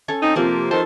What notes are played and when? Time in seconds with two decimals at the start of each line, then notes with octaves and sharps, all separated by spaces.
0.08 C#4 A4 C#5
0.22 C4 D#4
0.36 C3 F3 A#3 C4 G4
0.71 D#3 A4 C5